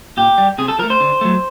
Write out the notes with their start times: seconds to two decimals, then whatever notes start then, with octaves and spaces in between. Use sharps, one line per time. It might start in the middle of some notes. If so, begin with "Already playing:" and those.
0.17 A#2 G4
0.38 G3
0.58 C3 G#4
0.68 A4
0.79 F3 A#4
0.83 A3
0.90 C5
1.00 D3
1.21 F#3 A3